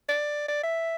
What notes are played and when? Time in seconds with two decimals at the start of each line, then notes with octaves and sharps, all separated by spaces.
0.09 D5
0.48 D5
0.63 E5